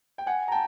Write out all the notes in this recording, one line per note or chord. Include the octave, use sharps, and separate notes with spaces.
G5
F#5 G#5
A#5
G5 A5